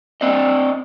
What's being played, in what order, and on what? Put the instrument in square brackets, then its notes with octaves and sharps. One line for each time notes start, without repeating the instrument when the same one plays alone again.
[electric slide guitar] C4 D5 D#5